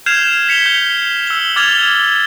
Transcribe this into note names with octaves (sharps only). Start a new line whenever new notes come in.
F6 G6 G#6 C7 E7 F7
B6 C#7 F7 G7
G6
E6 G7
D6 F6 G#6 A6 F7 G7